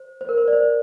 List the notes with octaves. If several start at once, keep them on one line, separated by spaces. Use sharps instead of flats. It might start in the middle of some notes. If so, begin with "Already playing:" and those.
Already playing: C5
C5
A#4
C5
D5
C5